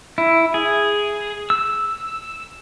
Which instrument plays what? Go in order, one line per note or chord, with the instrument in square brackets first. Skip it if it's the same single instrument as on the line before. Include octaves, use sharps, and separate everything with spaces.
[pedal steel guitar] E4
G#4
E6